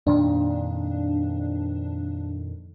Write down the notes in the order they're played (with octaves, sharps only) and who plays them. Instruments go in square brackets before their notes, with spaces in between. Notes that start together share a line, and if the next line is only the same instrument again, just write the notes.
[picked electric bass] F2 A#2 D#3 [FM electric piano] D4